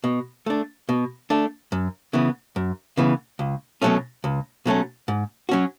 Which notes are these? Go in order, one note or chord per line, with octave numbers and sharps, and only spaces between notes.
B2
A3 D4
B2
A3 D4
F#2
C#3 E3 B3
F#2
C#3 E3 B3
C#2
B2 F#3 A3 C#4
C#2
B2 F#3 A3 C#4
G#2
F#3 C#4 F#4